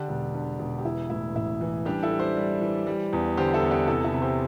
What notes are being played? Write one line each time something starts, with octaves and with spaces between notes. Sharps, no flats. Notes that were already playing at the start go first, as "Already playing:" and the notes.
Already playing: D3 D4 G4
E1
D3
E1
G4
E3 E4
A2 E4
A1 E4
E3
G3 D4 G4
E4 A4
G3
G4 C5
G3
E3
G3
E2
D3 G4 C5
E4 A4
E2
D4 G4
C3 E4 A4
E4 A4
C3
G4 C5